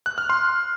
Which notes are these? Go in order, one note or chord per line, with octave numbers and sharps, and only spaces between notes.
F#6
F6
C6